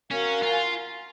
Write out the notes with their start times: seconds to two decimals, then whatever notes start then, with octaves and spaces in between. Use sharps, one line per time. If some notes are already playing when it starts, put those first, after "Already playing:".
0.11 C#4 F#4 A#4 F5 G#5
0.42 F4